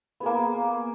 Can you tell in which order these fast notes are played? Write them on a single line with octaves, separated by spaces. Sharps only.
B3 G#4 A#3